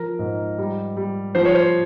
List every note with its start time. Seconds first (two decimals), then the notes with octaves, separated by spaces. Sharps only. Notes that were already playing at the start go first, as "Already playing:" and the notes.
Already playing: F3 A#4
0.19 G#2
0.58 G3
0.97 G3
1.35 F3 C5
1.45 C#5
1.55 C5